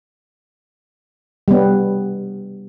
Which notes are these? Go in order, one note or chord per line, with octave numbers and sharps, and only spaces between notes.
G3 B3